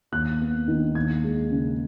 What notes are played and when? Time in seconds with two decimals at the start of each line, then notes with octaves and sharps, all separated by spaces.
0.12 D#2 F#6
0.41 B3
0.68 D#3
0.95 D#2 G#6
1.24 G#3
1.51 C#3